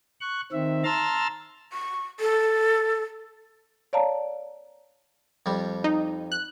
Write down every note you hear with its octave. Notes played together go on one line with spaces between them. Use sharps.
C#6 F#6
D#3 C4 E5
A5 A#5 C6 E6 F6 A6
C#6
A4
C#5 D5 F5 A5 A#5
F2 G3
D#4
F#6